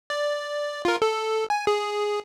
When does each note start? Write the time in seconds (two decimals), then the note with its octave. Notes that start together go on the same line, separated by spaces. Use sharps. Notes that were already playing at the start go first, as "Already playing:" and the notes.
0.10 D5
0.85 F4 A#4
1.02 A4
1.50 G#5
1.67 G#4